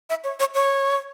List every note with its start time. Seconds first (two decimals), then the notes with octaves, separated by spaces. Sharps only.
0.10 E5
0.24 C#5
0.40 C#5
0.54 C#5